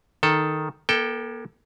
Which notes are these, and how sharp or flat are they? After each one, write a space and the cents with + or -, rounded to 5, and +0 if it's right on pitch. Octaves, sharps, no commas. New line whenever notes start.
D#3 +0 A4 +0
A#3 +40 A4 +0 G5 +0